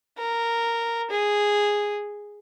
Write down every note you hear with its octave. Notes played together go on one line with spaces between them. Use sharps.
A#4
G#4